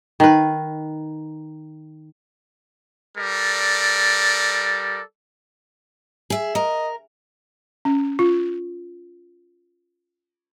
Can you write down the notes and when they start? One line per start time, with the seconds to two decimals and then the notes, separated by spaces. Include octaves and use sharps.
0.20 D#3 B4
3.18 G3 A4 A#4 D5
6.30 G#4 E5
6.55 A#4 D#5
7.85 C#4
8.19 F4